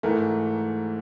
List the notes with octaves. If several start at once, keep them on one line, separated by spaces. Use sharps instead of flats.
G#2 E3 A3 A#4